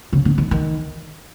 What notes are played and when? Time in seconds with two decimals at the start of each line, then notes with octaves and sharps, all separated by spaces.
0.13 C#3
0.25 D3
0.38 D#3
0.51 D#3